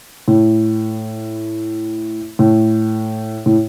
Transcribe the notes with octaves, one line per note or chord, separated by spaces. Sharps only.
A2
A2
A2